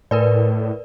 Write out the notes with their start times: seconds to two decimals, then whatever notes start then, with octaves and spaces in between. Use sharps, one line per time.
0.11 A2 A#4 B4 D5